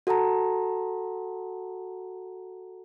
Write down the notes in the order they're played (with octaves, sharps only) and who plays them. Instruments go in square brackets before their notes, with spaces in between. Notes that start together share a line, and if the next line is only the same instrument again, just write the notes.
[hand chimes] F#4 A4 F#5 A5 A#5